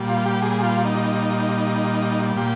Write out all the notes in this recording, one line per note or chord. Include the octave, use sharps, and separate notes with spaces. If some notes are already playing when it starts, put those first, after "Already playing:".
Already playing: A#2 G3
F4
G4
G#4
F4
D#4
A#2 G4